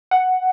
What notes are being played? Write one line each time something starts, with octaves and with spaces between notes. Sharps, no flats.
F#5